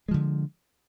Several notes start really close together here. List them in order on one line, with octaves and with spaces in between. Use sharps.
G#3 F3 D3